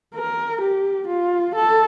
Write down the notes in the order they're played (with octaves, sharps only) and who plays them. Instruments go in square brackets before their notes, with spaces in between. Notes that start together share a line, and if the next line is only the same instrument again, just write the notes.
[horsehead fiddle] A#4
G4
F4
A4